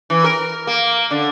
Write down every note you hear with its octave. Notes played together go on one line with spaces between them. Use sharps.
E3
A#4
A#3
D3